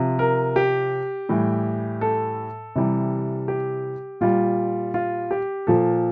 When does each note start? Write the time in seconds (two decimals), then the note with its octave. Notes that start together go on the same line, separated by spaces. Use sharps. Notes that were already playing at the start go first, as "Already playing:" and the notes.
Already playing: C3 F3
0.19 A#4
0.56 G4
1.29 A2 E3 G3
2.01 A4
2.76 C3 E3 G3
3.48 G4
4.21 A#2 G3 F4
4.94 F4
5.31 G4
5.67 A#2 F3 A4